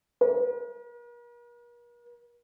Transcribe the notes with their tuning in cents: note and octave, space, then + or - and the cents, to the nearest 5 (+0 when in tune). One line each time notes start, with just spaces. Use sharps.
A#4 +45